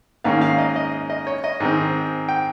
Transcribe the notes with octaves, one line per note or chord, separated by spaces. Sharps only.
G#2 D#3 A#3 C#4 F5
F5
D#5
D#5
D#5
C#5
D#5
G#2 D#3 G#3 C4
G5